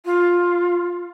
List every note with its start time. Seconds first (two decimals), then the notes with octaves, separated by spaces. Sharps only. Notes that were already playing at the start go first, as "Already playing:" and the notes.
0.05 F4